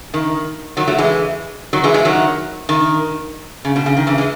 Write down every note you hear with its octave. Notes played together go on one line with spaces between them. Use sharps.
D#3
D#3 F#3
F#3 A3
E3 G#3
D#3 F#3
E3 G#3
E3 G#3
D#3 F#3
D#3
C#3
B2
C#3
D#3
C#3 E3
E3 G#3